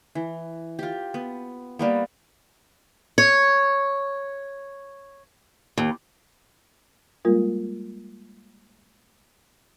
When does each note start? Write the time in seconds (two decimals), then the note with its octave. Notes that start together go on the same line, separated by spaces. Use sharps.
0.15 E3
0.79 F4 G4
1.14 B3
1.79 G3 A#3 B3
3.18 C#5
5.78 D#2
7.25 G3 G#3 A#3 F4 A#4